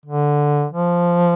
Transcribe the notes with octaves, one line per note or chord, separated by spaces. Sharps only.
D3
F3